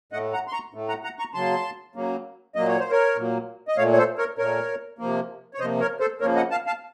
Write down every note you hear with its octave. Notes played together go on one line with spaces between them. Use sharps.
A2 A3 D#5 F#5
F#5 A#5
C6
A#5 C#6
A2 A3
F#5 A#5
F#5 A#5
A#5 C#6
C#3 F#3 A#3 A5 C6
C#3 F#3 A#3
A#2 F#3 A#3 D#5
C#5
C5
A#4 C#5
A#2 F#3 A#3
D#5
A#2 A3 C#5 F5
C#5
A4 C5
A#4 C#5
A#2 A3 A#4 C#5
C3 F3 A#3
C#5
C3 F3 A#3 C5 D#5
A#4 C#5
A4 C5
C#3 F3 A#3 A#4 C#5
D#5 F#5
F5 A5
F5 A5